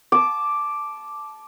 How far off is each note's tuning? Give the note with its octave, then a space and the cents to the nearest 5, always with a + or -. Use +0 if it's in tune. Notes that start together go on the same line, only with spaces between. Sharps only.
A5 -15 D6 +0